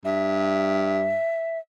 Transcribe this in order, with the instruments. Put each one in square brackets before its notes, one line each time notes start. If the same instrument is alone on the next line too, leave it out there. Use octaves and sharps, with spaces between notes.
[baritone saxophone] G2 [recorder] E5